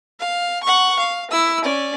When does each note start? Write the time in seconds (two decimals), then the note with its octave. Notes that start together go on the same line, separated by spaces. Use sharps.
0.20 F5
0.63 F#5 C#6
0.99 F5
1.31 E4 E6
1.64 C#4 D5